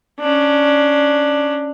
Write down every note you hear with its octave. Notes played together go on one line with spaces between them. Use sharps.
C#4 D4